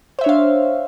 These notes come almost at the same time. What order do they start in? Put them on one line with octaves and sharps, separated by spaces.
C5 E5 C#5 D4 F5